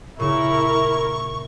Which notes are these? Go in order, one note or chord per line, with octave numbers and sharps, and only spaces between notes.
A#2 C#3 E4 A#4 C#6 E7